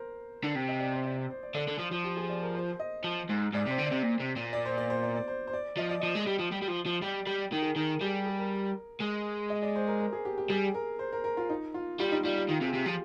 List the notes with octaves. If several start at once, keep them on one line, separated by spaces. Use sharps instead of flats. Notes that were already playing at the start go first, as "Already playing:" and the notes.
Already playing: A#4 C5
D3
C3
D#5
D5
C5
D5
D5
C5
D5
D3 D5
D3
F3
F3
G4
G#4
D5
A#4
C5
D#5
F3
G#2
G#2 D5
C3 C5
D3
D5
C3
A#2
C3
A#2
D5
C5
D5
C5
D5
D5
C5
C5
D5
F3 D#5
D5
F3 D#5
G#3
G3
F3
G3
G3
F3
F3
G3 D5
G3
D#3 A#4
G#4
D#3 A#4
G3 G#4
G#4
A#4
G#3
D#5
D5
C5
A#4
A#4
G#4
G4
G4
G3 G#4
A#4
C5
A#4
A#4
F4
D#4
F4
G3 F4
D#4
G3 F4
G4
D#3 F4
C3 G#4
C3 G4
F3 F4